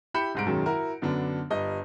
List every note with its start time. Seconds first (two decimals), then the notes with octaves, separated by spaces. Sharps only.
0.14 E4 G4 B5 G6 C#7 E7
0.35 C2 G#2 D7
0.46 B1 F#2 D#3 G#3
0.66 E4 F#4 A#4
1.02 F#2 D3 B3 D4
1.50 G1 G3 D#5